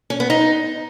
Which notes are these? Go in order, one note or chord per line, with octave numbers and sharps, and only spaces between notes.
C#4
B3
D#4